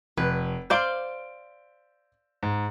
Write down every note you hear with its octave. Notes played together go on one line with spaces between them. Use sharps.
F1 B4
C5 D5 F5 G6 D7
G#2